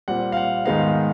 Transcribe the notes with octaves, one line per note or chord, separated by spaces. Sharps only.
A#2 G3 C4 F#5
F5
F#5
G#2 D#3 G#3 B3 D#4 F5